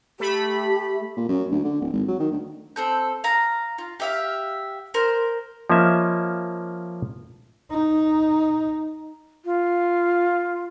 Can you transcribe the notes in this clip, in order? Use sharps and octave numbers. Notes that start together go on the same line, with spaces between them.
A3 G4 B5
A#2
F#2
D2
D3
D1
G#1
F#3
D#3
D2
C4 A4 G6
F5 A#5
F4
G4 E5 F5
A#4 C5
F3 A#3 C#4 D#5 E5
D#4
F4